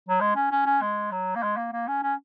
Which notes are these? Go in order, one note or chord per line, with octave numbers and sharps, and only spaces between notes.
F#3
G#3
C#4
C#4
C#4
G#3
F#3
A#3
G#3
A#3
A#3
C#4
C#4